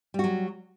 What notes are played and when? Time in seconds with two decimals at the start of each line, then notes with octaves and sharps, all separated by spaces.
0.14 G3
0.19 F#4
0.24 F#3